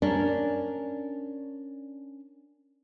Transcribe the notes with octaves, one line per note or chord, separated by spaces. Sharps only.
C#4 D4 A#4